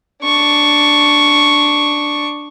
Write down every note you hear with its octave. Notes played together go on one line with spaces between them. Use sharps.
D4 C#6